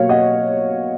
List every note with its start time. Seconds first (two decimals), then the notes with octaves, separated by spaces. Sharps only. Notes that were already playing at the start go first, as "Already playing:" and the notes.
Already playing: B2 F#3 A#3 C#5 F5
0.09 D#5 F#5